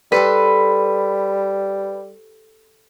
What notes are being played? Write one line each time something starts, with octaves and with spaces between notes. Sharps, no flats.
G3 G4 A4 B4 C5